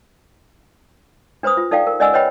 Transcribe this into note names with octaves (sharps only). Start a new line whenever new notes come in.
D4 B4 C5 B5 D#6
F4
D#4 A4 D5 F5 G5
A#4
C#4 D5 D#5 F#5 G#5 E6
B4 C#5 D#5 G5 B5